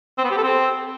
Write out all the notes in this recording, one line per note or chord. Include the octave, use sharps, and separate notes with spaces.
C4
B3
G4
A4
C4